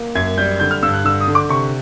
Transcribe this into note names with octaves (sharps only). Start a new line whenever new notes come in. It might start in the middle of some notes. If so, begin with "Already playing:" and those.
Already playing: A#3
F#2 G#6
G3 G6
D3 G6
F6
G2 E6
F#6
D3 E6
D#6
D3
D6
C3 C#6